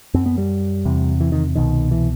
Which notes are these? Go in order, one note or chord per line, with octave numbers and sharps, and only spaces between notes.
F#2 C4
B3
G3
E2 C3
E3
D#3
C2 B2 D#3
E3